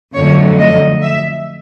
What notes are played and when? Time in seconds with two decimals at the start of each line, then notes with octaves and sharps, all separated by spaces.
0.14 F2 D3 F#3 A3 C#5
0.58 D#5
1.02 E5